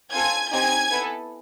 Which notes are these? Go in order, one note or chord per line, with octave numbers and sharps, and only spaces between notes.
C4 F4 A4 G#5 G#6
C4 D#4 G4 G#5 G#6
B3 E4 A4